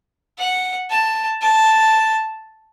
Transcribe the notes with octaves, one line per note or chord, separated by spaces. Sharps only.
F#5
A5
A5